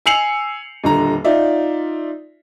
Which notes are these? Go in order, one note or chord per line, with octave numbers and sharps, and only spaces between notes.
G#5 E6 C7 C#7 F7 F#7
D#1 D3 A#5
D#4 F4 D5 E5